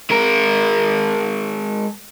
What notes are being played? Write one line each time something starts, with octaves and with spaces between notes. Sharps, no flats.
G#3 A#4